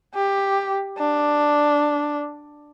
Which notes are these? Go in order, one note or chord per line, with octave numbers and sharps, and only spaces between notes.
G4
D4